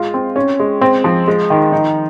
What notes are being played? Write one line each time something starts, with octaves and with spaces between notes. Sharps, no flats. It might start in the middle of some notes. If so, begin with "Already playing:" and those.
Already playing: G#3 F4
C4
C#4
G#3
C4
F3
G#3
D#3
D#4